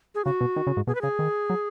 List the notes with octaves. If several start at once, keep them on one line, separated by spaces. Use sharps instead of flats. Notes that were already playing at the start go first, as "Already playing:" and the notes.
G#4
C#3 F#4
B2
D#3
C#3
G#2
B2 G#4
B4
C#3 G#4
D#3
F#3